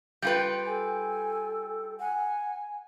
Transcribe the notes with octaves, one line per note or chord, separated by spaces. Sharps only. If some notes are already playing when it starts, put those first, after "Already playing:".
G3 F4 B4 G5 G6
A4 G#5
F#5 G#5